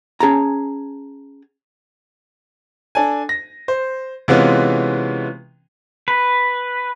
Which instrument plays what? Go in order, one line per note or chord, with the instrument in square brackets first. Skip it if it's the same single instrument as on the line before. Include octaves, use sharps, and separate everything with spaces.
[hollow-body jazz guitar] C#4 G#4 A5 A#5
[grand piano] D4 A4 G#5
A#6
C5
C3 E3 G#3 B3 C#4 F4
[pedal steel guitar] B4